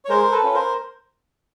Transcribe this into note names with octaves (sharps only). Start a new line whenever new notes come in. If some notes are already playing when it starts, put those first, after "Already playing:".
C#5
G#3 A#4 C5
A4 B4
C#4 F4
A#4 C5